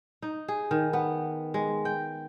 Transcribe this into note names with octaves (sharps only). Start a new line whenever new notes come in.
D#4
G#4
D#3
B3
G#3
G5